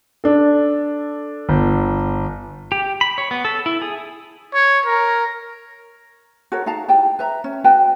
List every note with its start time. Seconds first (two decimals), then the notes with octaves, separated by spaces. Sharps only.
0.24 D4 A4
1.49 G1
2.72 G4
3.01 B5
3.18 C#5
3.31 B3
3.45 A4
3.66 E4
3.82 G#4
4.54 C#5
4.86 A#4
6.52 F#4 A4 A#4 C#5
6.66 D#4 F5 A5 A#5
6.89 E4 G4 G5 A5
7.19 B4 E5 A#5
7.44 C#4
7.64 F#4 B4 G5 A5